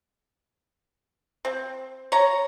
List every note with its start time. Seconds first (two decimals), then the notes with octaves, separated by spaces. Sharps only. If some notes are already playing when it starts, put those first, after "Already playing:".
1.45 C4
2.12 C#5 A#5